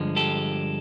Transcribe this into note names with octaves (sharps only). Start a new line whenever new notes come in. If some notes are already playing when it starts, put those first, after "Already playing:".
Already playing: G2 D3 F3 G#3
G4 A4